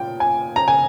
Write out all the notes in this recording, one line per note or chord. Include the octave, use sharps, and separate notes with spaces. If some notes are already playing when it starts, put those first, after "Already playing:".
Already playing: A#2 G5
G#5
A#5
G#5